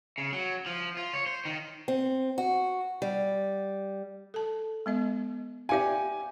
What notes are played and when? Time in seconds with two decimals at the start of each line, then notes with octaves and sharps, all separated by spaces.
0.18 C#3
0.33 F#3
0.66 F3
0.97 F4
1.13 C#5
1.26 C5
1.45 D#3
1.88 C4
2.38 F#4
3.02 G3
4.34 A4 A5
4.86 G#3 B3 D#5
5.69 G4 D5 E5 F5 G#5